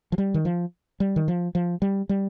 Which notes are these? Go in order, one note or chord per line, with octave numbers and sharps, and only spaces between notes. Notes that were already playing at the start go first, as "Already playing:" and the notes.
F3
G3
D#3
F3
G3
D#3
F3
F3
G3
G3